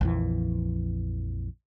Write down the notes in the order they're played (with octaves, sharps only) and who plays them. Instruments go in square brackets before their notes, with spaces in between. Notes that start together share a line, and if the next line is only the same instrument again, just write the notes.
[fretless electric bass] A#1 F2 E3